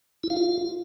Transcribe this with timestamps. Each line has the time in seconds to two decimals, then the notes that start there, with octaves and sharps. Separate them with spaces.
0.24 E4
0.30 F5
0.37 F4